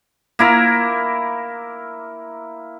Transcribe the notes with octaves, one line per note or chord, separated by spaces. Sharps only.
A#3 E4 A#4